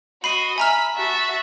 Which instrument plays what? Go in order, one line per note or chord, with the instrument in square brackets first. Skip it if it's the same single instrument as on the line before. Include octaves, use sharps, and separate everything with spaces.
[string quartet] F#4 D#5 [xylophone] B5 C7 D#7
[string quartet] E5 B5 [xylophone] G#5 A#5 F6
[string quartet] F#4 E5 A5